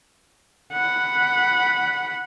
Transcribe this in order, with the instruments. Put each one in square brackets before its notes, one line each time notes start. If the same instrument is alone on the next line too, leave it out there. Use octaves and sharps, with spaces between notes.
[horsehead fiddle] F#5 B5